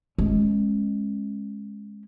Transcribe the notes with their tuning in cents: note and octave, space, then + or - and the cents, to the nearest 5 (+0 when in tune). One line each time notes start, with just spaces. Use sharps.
G#3 +0 C#4 -25